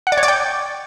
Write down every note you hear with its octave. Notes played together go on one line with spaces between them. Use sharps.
F#5
D5
C#5
D5
G5